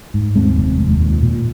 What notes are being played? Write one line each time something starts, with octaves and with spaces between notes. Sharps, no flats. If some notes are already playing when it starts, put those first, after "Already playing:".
G#2
D#2 G#3 C4
F1
D#2
A#2
A#2